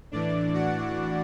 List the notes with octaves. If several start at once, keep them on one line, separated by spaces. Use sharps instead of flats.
A2 E3 D4 D5
F#4 F#5